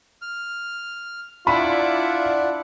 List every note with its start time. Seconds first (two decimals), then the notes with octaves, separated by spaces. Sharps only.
0.22 F6
1.47 D4 E4 F4 D5 E5 F#5 B5